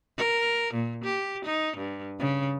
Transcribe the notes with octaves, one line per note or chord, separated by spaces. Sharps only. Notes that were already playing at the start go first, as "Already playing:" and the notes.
A#4
A#2
G4
D#4
G2
C#3